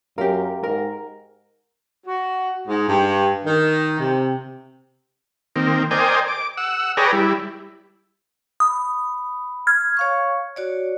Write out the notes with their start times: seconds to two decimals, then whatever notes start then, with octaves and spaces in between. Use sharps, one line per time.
0.18 F#2 G4 A#4 F5
0.64 G#2 A#4
2.06 F#4
2.67 G#2
2.87 G2
3.45 D#3
3.98 C3
5.56 D#3 A#3 C4
5.91 A#4 C5 D5 D#5 G5 G#5
6.28 D6
6.57 F#5 E6
6.97 G#4 B4 C#5 D5 G5 A#5
7.12 G3 E4
8.60 B5 D#6
9.67 F6 G#6
9.97 C#5 F5 C#6
10.56 F#4 C#5 D5